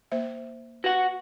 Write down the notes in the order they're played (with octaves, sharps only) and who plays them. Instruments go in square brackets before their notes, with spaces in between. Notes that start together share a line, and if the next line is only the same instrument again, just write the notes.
[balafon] A#3 C5 E5
[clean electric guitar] F#4 F#5 [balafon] B4